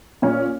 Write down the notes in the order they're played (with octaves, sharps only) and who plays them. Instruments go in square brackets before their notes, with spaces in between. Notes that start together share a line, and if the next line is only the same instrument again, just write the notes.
[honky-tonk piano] A#2 C#4